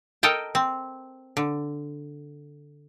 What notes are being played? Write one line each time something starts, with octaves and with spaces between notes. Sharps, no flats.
A4 A#4 D#5 G5 A5
C4
D3